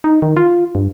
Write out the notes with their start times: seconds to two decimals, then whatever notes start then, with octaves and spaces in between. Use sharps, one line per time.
0.04 D#4
0.22 D#3
0.37 F4
0.75 G2